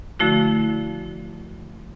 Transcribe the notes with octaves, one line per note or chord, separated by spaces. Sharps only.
D3 F3 A3 E4 F#4